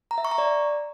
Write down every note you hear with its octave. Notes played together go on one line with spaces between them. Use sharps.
A#5
E5
C#6
A#5
D5